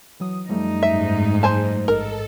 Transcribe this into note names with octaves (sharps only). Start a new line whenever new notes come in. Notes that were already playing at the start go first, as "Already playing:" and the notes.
E3 F#3 D#6
F#2 F3 G3 A3 D#4
G#2 E5
C5 G#5 A5
A1 G#2 A4 A#4 D#5